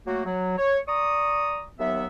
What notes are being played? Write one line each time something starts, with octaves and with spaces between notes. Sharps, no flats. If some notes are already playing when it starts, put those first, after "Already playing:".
F#3 A3 A#3 F#4
F#3
C#5
D5 A#5 C#6 D#6
D#2 F#3 B3 E5